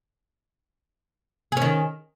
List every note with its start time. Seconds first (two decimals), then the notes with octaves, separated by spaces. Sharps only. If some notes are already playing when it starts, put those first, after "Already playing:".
1.52 G#4
1.57 C#4
1.62 D#3